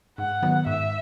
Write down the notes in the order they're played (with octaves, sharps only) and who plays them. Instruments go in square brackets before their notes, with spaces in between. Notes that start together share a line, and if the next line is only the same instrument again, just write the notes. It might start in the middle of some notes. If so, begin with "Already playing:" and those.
[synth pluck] G#2 [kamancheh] F#5
[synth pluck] D#3 F#3 B3
[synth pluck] G#2 [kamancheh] E5